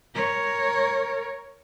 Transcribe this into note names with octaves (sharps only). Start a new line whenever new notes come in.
A#4 C#5